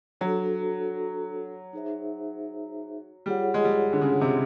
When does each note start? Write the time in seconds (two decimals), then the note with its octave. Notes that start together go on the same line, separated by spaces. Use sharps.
0.21 F#3 D4 F#4 A4 C5
1.73 D#4 G#4 C5 E5
3.26 G3 F4 G#4 C#5 F#5
3.54 G#3
3.64 G3
3.93 D3
4.01 C#3
4.21 C3